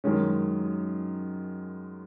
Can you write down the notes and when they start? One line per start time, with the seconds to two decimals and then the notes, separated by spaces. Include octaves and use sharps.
0.04 F#2 D#3 G#3 C#4